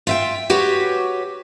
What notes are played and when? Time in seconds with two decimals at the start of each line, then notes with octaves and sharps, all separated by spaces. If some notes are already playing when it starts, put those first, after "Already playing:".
0.07 F4 E5 G5
0.50 F#4 G4 B4 C#5